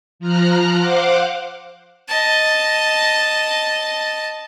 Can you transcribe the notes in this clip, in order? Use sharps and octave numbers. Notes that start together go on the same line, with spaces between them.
F3 A#5 F6 F#6
C5 F5 F#5 D6 F#6
D#5 A5